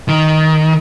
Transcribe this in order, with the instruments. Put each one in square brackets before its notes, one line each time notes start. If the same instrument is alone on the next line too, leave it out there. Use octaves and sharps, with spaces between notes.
[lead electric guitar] D#3